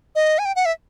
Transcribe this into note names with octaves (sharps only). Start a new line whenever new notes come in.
D#5
G#5
G5
F#5
E5